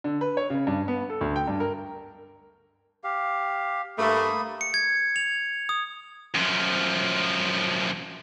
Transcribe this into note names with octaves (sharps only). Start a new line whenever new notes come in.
D3
B4
C#5
C#3
G2
B3
A4
D2
G5
G2
A#4
G4 F5
G2 A3 A#3 B5 D#6
C#7
G#6
F7
D#6
F#2 F3